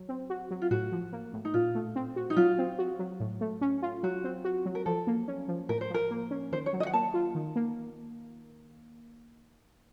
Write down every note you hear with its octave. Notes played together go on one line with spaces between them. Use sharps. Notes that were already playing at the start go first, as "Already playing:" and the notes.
Already playing: F#3
C4
F#4
F#3
F4
A2 F#4
F3
A#3
A2
D#4
A#2 F4
A3
C4
F#4
D#4
F#3 F4
C4
F#4
F#3
A2
A3
C#4
F4
F#3 F#4
C4
F#4
F#3
A#4
F3 A4
A#3
C#4
F3
A2 A#4
C5
F3 A#4
A#3
C#4
D#3 C5
C#5
F#3
D#5
F#5
A#3 A5
F4
D#3
A#3